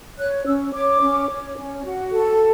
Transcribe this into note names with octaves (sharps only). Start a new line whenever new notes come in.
C#5 F#6
C#4 E6
C#5 D6
C#4
C#5
C#4
F#4
A4